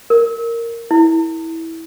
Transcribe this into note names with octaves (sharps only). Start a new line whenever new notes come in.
A#4
E4